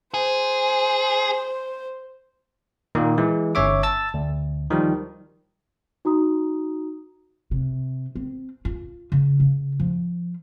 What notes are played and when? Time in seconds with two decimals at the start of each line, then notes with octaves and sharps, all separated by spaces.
0.14 G#4 C5
2.95 A#2 D#3 A#3
3.18 E3 G#3
3.55 G1 C#4 C#5 E5 D6
3.83 A5 E6 A6
4.14 D2
4.71 D#3 F3 G3
6.05 D#4 F#4 A#5 D#6
7.51 C3
8.15 C4
8.65 F4
9.12 C#3
9.40 C#3
9.80 F3